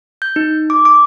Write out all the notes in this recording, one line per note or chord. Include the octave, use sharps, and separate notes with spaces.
G6
D#4
D6
D6